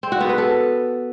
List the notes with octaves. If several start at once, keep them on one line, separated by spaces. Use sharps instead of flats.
C4
F#4
B3
B4
A4